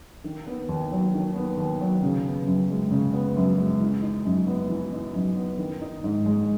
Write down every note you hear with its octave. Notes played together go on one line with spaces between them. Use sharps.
D#3
B3
D#2
F#3
D#3
B3
D#2
F#3
C#3
B3
F#2
G#3
C#3
B3
F#2
G#3
E3
D#4
F#2
B3
E3
D#4
F#2
B3
D#3
D#4
G#2
G#3